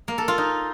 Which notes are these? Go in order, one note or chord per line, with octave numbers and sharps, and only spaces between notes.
A#3
A4
F4
D#4